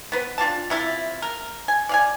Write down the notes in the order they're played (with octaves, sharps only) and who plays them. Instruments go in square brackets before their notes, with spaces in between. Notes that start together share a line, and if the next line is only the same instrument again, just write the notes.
[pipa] B3 B4 C5
D4 F4 G4 A5
C3 E4 F4
A#4
G#5
D5 F5 G#5